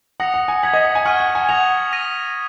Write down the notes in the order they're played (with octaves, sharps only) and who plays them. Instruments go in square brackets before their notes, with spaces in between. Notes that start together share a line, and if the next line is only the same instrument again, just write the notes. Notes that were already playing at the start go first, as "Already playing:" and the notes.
[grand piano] F#5 [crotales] D#6 A#6 C#7 F7
[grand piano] F#5
G#5
[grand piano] F#5 [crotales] G#6 B6 F#7
[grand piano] D#5
F#5
G#5
[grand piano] F#5 [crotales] C#6 F6 G#6 D#7
[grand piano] F#5
G#5
[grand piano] F#5 [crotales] D#6 A#6 F7
[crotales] D#6 A#6 D#7